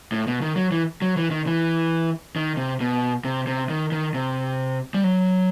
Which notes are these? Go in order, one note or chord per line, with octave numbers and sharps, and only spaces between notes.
A2
B2
D#3
F#3
E3
F#3
E3
D#3
E3
D#3
C3
B2
C3
C3
D#3
D#3
C3
G3
F#3